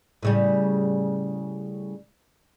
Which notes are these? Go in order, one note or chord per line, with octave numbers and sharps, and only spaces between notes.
A2 C#3 G3